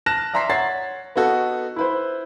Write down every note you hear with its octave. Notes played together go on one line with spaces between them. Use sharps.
A5 F6 F#6 A#6 E7
D5 E5 A#5 C6 B6 C7
C#5 F#5 A6 C7
B3 D#4 F#4 A4
E4 B4 C5